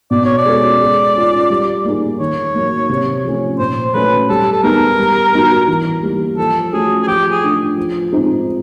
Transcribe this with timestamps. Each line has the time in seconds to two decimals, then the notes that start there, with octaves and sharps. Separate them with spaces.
0.11 B2 D5
0.25 C#5
0.38 D5
0.45 G#3 C#4 F#4 A4
0.81 G#3
1.15 C#4 F4 G#4
1.50 G3
1.85 A#3 D#4 G#4
2.19 D#3 C#5
2.54 F#3 A#3
2.89 C3
3.24 F3 A3 C#4
3.59 A#2 C5
3.94 F#3 A3 C#4 B4
4.29 G3 A4
4.52 A4
4.63 B3 D#4 G#4 A#4
4.99 G3
5.34 B3 D#4 F#4
5.68 E3
6.02 G3 A#3
6.38 F3 A4
6.73 A3 C#4 F#4 G#4
7.03 G#4
7.07 F3 G4
7.31 G#4
7.43 A3 D4
7.78 F3
8.12 G#3 C4 D#4